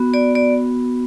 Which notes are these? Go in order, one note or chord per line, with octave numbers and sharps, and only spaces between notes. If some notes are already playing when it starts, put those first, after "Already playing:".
Already playing: B3 F#4
D5
D5